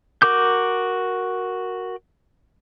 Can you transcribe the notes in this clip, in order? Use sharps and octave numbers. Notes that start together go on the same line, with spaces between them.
F#4 A#4 D6 G6